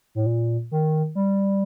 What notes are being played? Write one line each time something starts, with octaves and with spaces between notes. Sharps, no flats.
A2
A#2
D#3
G3